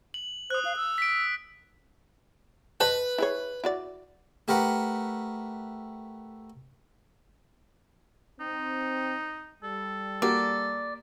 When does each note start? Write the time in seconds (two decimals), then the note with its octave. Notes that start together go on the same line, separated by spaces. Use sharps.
0.14 F#7
0.50 C5 D#6 F#6
0.65 F5
0.76 E6
0.98 B6 D7
2.80 B4 C5 D#5 A5
3.18 E4 G#4 C#5
3.64 E4 F#4 D5
4.48 A3 G4 A#4 B4 F#5
8.40 C4 D#4
9.63 G3 A4
10.22 A#3 F#4 G4 D5